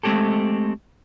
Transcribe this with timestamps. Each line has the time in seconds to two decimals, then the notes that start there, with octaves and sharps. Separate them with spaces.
0.03 G#3 A3 C4 G4 A4